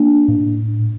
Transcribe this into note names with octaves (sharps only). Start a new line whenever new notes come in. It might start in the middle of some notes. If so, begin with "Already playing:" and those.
Already playing: A#3 D4
A2